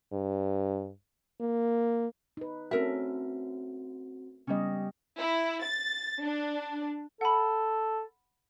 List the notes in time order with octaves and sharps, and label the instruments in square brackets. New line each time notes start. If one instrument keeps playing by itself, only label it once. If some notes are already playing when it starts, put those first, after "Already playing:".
[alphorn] G2
A#3
[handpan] D#4 B4
[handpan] A3 C#4 [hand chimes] C4 F#4 [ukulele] A4 A#4 E5
[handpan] C#3 B3 D#5 [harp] G3 C#4
[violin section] E4
A6
D4
[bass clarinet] A4 [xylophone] F#5 B5